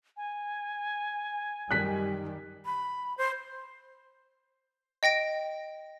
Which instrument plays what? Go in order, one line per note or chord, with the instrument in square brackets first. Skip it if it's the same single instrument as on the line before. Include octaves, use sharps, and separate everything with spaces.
[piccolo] G#5
[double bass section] F#2 D#3 G3 [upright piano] F#6 B6
[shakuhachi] B5
C5
[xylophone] D#5 G5 A#6 D7